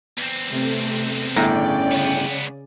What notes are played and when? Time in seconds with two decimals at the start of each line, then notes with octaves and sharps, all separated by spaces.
0.18 E2 C4
0.51 C3 A3
1.36 G1 A2 C#3 C#4 D5 G5 A#5
1.92 C#2 B3